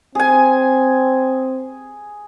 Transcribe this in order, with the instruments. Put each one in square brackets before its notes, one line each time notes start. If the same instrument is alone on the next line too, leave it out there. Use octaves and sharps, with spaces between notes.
[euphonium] C4 [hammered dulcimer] G#4 G#5